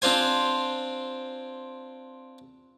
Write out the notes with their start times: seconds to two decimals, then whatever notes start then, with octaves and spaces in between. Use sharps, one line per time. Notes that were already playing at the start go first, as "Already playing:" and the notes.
0.02 C4 D4 F4 C5 G#5